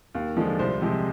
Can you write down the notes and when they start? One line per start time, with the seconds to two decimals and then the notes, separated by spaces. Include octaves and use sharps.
0.15 D#2
0.37 D3 F3 G#3
0.59 C2 C5
0.81 C3 F3 G#3